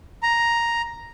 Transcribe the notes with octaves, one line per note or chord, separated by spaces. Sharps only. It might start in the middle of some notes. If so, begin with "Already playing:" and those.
A#5